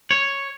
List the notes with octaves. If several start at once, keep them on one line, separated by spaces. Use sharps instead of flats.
C#5